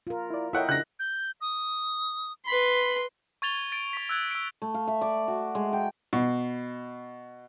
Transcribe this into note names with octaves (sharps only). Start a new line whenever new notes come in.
F4 A#4
E4 D5
E4 A4 A#4 C#5 D#5 E5 F#5 G5
C#3 D4 F#6 A#6
G6
D#6
B4 B5 C6
C#6 G#6 A6 F7 G7
G#6
A6 D7
C#6 B6
E6 F#6 G#6
E6 D7
A3
F5
E5
D5
F#4
G#3
G5
B2